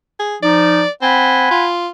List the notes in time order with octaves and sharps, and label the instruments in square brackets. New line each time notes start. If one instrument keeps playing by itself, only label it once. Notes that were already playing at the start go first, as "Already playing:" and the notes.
[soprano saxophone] G#4
[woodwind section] F3 D#4 [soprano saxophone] D5
[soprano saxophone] C4 [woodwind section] F#5 G#5 B5
[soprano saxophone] F4